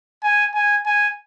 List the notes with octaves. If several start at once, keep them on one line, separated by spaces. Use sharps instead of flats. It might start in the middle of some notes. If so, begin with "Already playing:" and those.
G#5
G#5
G#5